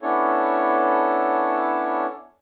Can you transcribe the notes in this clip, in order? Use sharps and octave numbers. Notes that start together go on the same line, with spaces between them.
B3 C#4 D4 E4 A4 C#5